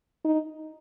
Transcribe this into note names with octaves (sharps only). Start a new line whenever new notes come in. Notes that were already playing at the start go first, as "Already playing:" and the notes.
D#4